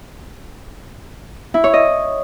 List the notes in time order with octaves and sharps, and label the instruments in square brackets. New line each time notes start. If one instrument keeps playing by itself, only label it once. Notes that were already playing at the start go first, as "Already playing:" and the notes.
[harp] E4
C#5
D#5